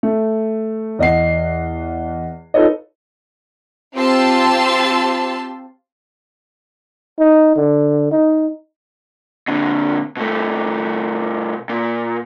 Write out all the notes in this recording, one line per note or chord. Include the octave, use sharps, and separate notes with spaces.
A3
E2 D#5 F#5 C7
D#4 F4 A4 B4 C#5 D#5
C4 F4 G4 A5 C6 E6
D#4
D3
D#4
A#2 D3
B2 A3
A#2